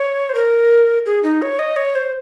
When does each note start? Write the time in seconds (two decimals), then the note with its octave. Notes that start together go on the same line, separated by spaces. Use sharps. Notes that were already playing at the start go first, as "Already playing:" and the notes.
Already playing: C#5
0.29 C5
0.35 A#4
1.06 G#4
1.23 D#4
1.42 C#5
1.59 D#5
1.76 C#5
1.95 C5